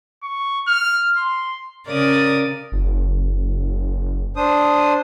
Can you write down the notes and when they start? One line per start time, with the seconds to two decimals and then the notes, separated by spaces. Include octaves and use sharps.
0.22 C#6
0.67 F6
1.17 C6
1.86 C#3 A#4 D5 D#6
2.72 F#1
4.36 D4 C5 D#6